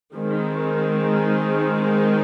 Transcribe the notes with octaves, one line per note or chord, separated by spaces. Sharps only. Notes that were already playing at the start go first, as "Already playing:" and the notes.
D#3 G#3 C4
D#4
D#4